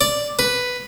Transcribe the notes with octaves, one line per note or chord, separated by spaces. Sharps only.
D5
B4